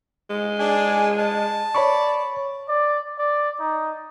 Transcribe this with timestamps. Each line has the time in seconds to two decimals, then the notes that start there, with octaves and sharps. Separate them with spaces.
0.30 G#3
0.59 D4 G#4
1.19 A5
1.75 C#5 D5 B5 C#6
2.69 D5
3.19 D5
3.60 D#4